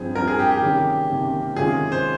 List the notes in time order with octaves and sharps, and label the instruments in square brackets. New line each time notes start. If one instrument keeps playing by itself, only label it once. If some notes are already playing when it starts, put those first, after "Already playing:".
Already playing: [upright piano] G2 F3 C4 [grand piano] G#4
[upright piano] G2 F3 C4 [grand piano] A#4
[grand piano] G#4
G4
G4
[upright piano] C3 D#3 A#3 C#4
C3 D#3 A#3 C#4
[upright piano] C3 D#3 G#3 C#4 F4 [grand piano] G#4
[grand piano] C5